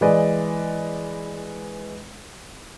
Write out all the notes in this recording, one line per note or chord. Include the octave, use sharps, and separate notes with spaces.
E3 G#3 B4 D5 D#5